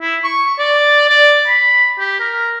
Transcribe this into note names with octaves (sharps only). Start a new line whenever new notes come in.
E4
C#6
D5
D5
B5
G4
A#4